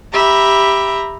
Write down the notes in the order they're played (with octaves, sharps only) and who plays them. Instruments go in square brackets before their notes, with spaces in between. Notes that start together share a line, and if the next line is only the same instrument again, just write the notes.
[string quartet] G4 E5 A#5 B5